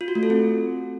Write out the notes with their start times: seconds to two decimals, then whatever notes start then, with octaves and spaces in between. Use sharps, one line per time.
0.01 F4
0.08 F#4
0.15 A3
0.23 A4
0.30 C4